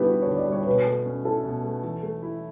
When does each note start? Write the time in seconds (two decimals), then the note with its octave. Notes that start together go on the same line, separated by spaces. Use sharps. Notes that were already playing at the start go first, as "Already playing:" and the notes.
Already playing: D3 G3 B3 E4 G4 B4
0.08 F#4
0.22 C#5
0.27 D3
0.37 D5
0.47 G3
0.52 C#5
0.67 B2 B4
0.86 A3
1.06 C#4
1.24 E4 A4
1.44 B2
1.64 A3
1.84 E3
2.03 A3
2.22 E4